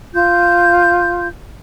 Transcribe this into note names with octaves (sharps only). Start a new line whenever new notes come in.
F4 G6